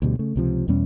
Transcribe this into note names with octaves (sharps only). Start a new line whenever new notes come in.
D2 B2 G3
C#3 A3
C#2 C3 F3
E2 B2 G3 C#4